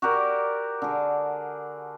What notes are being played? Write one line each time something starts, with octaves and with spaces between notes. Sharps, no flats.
F#4 G4 A#4 D5
D3 G#4